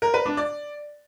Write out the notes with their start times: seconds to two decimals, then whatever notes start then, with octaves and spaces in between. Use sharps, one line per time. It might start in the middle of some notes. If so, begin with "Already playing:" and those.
0.02 A#4
0.14 B4
0.26 D4
0.37 D5